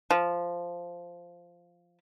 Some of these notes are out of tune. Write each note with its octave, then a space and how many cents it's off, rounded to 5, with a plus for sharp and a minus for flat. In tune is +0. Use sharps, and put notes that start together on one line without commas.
F3 -5